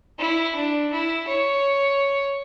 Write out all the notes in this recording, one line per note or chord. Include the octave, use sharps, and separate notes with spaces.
E4
D4
E4
C#5